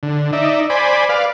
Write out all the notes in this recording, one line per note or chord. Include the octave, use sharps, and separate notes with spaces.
D3
D#4 D5 E5
C5 D5 G#5 B5
B4 D5 F5